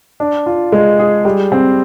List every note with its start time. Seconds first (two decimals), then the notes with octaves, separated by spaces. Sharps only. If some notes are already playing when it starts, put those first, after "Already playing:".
0.20 D4
0.46 F4
0.72 G#3
0.99 G#4
1.25 G3
1.52 C4